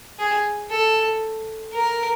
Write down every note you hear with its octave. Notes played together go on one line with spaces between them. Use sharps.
G#4
A4
A#4